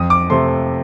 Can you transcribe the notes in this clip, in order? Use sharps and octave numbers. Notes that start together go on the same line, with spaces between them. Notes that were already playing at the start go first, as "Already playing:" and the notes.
Already playing: F2 D#6
D6
C3 F3 A3 C6